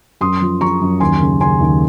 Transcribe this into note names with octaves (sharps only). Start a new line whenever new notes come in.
F#2 C6 D#6
F3
F3 A#5 C#6
F#2
D#2 G#5 C6
C#3
C#3 G#5 C6
D#2